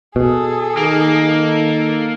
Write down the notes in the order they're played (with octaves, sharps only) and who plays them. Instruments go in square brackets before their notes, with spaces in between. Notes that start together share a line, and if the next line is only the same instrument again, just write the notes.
[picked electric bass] B2 [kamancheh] G#4 A4
[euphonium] D#3 [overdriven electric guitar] A#3
[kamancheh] A4